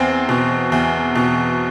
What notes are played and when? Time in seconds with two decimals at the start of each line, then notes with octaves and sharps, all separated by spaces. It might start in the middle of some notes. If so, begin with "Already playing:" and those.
Already playing: E2 C4
0.29 B2
0.72 E2
1.15 B2